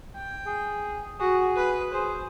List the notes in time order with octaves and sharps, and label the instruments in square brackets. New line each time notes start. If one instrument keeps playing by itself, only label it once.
[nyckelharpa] G5
[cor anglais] G#4
[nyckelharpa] F#4 [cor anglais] G#4
[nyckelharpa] B4
[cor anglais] G#4 [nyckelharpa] C5